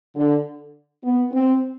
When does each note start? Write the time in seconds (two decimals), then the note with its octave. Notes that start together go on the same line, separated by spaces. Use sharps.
0.15 D3
1.03 B3
1.32 C4